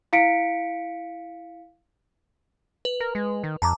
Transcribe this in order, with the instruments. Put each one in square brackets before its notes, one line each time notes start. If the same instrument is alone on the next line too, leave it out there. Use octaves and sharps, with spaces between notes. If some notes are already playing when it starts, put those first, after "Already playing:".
[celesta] E4 F5 B6 C#7 D7
[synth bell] B4
[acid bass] A#4
G#3
D#3
[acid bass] F2 [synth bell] A5 A#5 D6